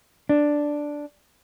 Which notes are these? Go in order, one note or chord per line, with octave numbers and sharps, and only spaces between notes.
D4